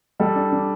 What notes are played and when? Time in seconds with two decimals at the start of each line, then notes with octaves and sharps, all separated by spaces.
0.20 G3 A4
0.36 D4
0.52 D4